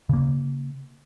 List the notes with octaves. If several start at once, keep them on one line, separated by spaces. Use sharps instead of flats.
C#3 A#3